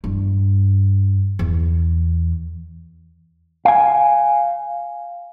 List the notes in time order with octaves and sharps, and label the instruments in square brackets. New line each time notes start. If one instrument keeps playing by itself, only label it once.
[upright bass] G2
E2
[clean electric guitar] F5 G#5